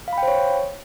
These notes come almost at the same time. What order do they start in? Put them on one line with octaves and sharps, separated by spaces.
F5 B5 G5 C5 C#5